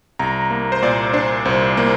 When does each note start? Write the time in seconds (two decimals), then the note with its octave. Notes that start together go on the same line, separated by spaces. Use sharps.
0.19 C2 A#5
0.51 A#3
0.72 C5
0.82 A#2 D5
1.13 D4 C5
1.45 C2 C5
1.77 A#3